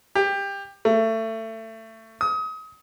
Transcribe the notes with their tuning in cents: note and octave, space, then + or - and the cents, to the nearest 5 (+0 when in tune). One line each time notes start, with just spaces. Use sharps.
G4 +20
A3 +25
D#6 +30